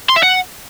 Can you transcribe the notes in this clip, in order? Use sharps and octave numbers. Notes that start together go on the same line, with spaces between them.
C6
E5
F#5